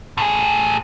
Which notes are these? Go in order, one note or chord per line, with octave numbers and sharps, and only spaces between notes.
A2 G#4